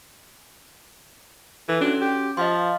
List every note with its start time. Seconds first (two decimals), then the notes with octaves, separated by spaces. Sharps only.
1.69 E3 A4
1.81 C#4 D4 F#4
2.01 G4
2.37 F3 D#5 F5 C6